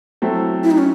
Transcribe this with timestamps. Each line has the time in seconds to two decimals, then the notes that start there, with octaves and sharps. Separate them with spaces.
0.22 F#3 A3 C4 E4 A4
0.64 E4
0.71 D#4
0.78 C#4